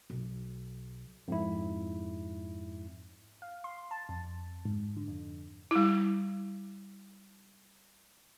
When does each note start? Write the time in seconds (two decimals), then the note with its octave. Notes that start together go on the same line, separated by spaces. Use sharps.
0.10 B1
1.28 F2 G#2 E4
3.42 F5
3.64 C6
3.91 A5
4.09 F2
4.65 G#2
4.97 D3
5.08 F2
5.71 G3 E4